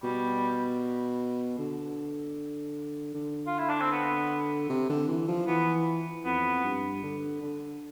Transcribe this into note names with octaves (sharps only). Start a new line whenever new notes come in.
B2 G3
D3
D3
F4
E4
D4
C4
B3
C3
D3
E3
F3
E3 B3
F2 B3
G2
D3
D3